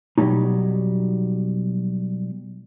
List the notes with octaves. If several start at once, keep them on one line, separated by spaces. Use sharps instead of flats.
B2 F#3 G3 A3 C#4 D#4